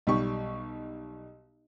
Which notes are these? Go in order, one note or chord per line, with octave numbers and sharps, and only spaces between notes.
B1 G3 G4 C#6